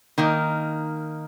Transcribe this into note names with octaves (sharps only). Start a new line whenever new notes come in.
D#3 A#3 D#4